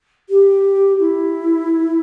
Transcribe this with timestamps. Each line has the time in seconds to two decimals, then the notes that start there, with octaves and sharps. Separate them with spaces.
0.29 G4
0.99 E4